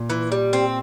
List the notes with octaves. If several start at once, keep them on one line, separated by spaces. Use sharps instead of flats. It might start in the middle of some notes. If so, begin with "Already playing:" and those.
Already playing: A#2
E3
G3
C4